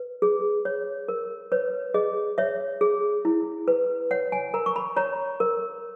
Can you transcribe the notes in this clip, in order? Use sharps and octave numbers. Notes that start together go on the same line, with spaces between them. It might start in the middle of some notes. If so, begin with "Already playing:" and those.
Already playing: B4
G#4
C#5
A#4
B4 C#5
G#4 D#5
C#5 E5
G#4
E4
B4
C#5 F#5
G#5
A#4 A#5
C#6
B5
C#5 A#5
A#4